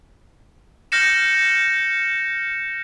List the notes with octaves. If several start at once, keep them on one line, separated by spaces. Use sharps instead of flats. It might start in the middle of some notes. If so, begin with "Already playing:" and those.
F6 G6 A#6 C#7 E7